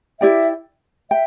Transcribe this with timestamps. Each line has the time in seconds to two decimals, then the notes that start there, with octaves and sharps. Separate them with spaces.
0.20 E4 G4 D5 E5 G5
1.11 E5 G5